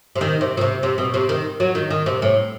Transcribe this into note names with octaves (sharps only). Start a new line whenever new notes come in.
C3
D#3
C3
B2
C3
C3
B2
C3
D#3
F#3
D#3
D#3
C3
A2